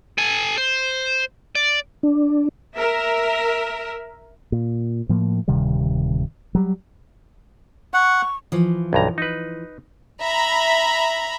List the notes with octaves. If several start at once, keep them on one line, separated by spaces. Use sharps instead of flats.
A4 G#5
C5
D5
D4
A#4 E5
A#2
A2 F3 A#3
D1 C3 D#3 G3
F#3 G3
F#5 C#6
E3 F3
B1 G2 A#5
D#4 B4
E5 A#5 B5